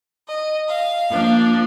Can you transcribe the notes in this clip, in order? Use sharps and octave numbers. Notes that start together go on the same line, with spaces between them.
D#5
F5
F3 A#3 D4